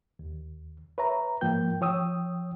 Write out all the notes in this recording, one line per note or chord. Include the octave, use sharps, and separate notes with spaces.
D#2
B4 C#5 E5 A#5
G#2 F3 A#3 G5 G6
F3 C#5 G5 D#6 E6